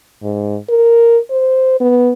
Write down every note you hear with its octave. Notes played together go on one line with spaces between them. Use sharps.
G#2
A#4
C5
B3